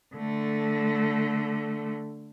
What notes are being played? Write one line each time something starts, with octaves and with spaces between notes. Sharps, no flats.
D3 A3